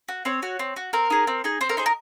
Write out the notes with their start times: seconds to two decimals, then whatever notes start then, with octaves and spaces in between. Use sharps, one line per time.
0.08 F#4
0.25 C4 C#5
0.43 F#4
0.59 C4
0.76 F#4
0.93 C4 A#4
1.10 D#4 G#4
1.27 C4
1.44 D#4 G#4
1.61 C4 C5
1.69 A#4
1.77 D#4 G#4 C5
1.86 A#4